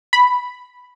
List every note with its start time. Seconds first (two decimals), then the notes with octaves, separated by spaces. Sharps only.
0.13 B5